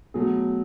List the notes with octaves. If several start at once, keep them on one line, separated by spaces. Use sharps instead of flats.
B2 F#3 A3 G#4